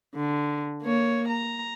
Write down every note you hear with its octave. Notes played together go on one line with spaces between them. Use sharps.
D3
A#3 C#5
A#5